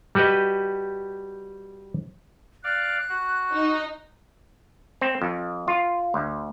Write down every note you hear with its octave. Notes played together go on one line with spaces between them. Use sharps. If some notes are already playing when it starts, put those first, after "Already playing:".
G3 F#4 G4 B4 D#5
D5 F5 F#6
F#4
D#4
C4
F2
F4
D2